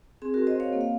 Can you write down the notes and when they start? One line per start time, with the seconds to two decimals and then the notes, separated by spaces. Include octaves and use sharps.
0.22 C4 G#4
0.34 F#4 A#4
0.39 C4
0.47 C5 D#5
0.55 C4 C#5 F5
0.73 A#3
0.81 F5